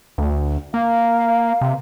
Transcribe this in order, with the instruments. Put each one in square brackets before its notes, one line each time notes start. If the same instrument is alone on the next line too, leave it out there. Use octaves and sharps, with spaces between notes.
[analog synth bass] D2
[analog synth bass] A#3 [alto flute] F5
[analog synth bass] C3